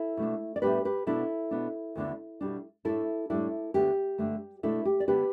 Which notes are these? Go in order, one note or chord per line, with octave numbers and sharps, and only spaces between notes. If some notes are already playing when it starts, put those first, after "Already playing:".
Already playing: E4 A4
B2 A3 D4
D5
A2 G3 B3 D4 G4 B4
G4 B4
B2 B3 D4 E4 A4
B2 B3 D4
D2 D3 B3 D4
B2 G3 D4
A2 A3 D4 E4 A4
A2 G3 D4 E4 A4
D2 D3 B3 D4 G4
G2 D3 A3
B2 A3 D4 E4 A4
G4
D5
D3 B3 D4 G4 B4